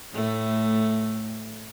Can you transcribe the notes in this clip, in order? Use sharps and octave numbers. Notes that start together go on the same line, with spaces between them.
A2 A3